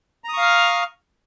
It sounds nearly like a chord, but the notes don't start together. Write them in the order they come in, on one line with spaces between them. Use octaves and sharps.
A#5 D#6 C#6 F5 F6